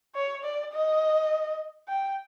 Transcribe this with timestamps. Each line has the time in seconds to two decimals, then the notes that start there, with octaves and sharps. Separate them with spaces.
0.15 C#5
0.44 D5
0.73 D#5
1.88 G5